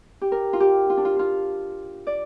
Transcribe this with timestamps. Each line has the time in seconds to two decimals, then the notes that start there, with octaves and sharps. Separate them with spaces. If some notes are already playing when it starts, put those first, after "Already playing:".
0.21 G4
0.32 A#4
0.53 F4
0.60 G4
0.90 F4
0.97 D4
1.05 F4
1.19 F4
2.07 D5